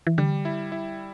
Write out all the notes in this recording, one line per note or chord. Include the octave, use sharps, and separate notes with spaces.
E3
D3 G3
E4
E4